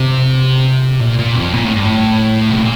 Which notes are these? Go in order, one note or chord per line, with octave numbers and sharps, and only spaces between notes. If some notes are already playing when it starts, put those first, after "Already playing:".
Already playing: C3
A#2
A#2
F2
A#2
A2
G2
A2
C3
A#2